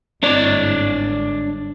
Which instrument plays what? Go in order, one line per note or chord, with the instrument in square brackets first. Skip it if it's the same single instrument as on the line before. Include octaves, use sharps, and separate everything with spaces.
[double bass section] G1 G#2 [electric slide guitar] D4 C#5 D5